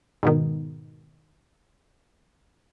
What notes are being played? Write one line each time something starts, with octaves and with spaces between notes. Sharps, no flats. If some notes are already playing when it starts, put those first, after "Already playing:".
G#2 B2 D#3